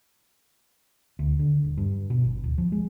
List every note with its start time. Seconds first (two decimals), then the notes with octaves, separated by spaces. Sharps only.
1.19 D2
1.39 D3
1.64 D#1
1.77 G2
2.10 B2
2.24 G#1
2.44 D1
2.58 F3
2.72 G#3